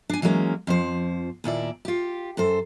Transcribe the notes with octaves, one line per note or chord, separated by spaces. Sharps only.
D4 G#5
E3 F#3 G#3 A#3 C#4
F2 F3 C5
D#2 A#2 E4 D5
F4 G4
F#2 A4 C5